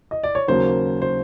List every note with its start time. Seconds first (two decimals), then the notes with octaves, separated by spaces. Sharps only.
0.11 D#5
0.23 D5
0.35 C#5
0.48 D#2 C#3 F#3 A#3 C5
1.02 C5